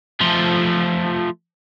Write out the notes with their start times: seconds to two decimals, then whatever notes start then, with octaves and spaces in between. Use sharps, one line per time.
0.21 F3 A3